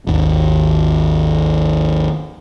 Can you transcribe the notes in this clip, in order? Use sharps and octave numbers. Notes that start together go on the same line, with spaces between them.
G#1 D#2